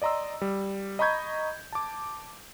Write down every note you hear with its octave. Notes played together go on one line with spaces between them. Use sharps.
D5 D#5 A#5 C6 E6
G3
D#5 A#5 B5 C#6 G6 G#6
A5 D6